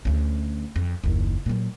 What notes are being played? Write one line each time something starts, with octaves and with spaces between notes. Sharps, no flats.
D2 C#4
F2
F#1 D#2
A#2 F#3